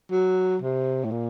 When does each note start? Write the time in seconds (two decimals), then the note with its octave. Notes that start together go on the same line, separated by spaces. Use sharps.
0.11 F#3
0.62 C3
1.04 A2
1.11 A#2